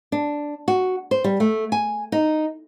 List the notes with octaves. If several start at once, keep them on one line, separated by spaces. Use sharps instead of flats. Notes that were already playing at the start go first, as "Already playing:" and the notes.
D4
F#4
C5
G3
A3
G#5
D#4